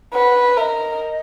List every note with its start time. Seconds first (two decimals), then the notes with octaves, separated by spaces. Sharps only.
0.14 B4 F#5
0.57 A#4 E5
0.61 D#5